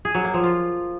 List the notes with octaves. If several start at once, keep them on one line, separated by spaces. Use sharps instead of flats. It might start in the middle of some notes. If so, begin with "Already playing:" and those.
G#4
F#3
A#3
F3
F4